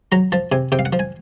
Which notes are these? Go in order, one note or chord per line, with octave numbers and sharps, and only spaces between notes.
F#3 A#5
F3 A5
C3 G#5
C3 G5
F5
F#5
F3
G#5